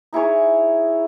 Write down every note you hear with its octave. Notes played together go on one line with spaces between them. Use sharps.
D#4 E4 G#4 C#5